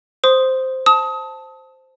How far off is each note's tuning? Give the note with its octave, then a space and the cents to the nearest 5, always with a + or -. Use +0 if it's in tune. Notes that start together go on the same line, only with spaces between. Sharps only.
C5 +0 C6 +0 D#6 +0
A5 +0 D#6 +30